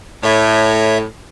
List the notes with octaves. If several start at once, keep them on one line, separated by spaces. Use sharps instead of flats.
A2 C#5 E5